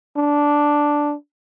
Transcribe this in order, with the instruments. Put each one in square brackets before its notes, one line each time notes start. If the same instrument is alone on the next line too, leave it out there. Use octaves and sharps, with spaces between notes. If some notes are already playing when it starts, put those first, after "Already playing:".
[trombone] D4